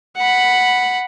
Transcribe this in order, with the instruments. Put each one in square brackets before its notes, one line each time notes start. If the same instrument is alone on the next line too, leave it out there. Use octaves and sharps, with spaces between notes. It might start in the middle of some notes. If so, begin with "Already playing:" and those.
[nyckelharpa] F#5 B5